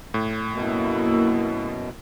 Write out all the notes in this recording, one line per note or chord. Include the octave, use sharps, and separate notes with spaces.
A2
F#2 B2 A#3 E4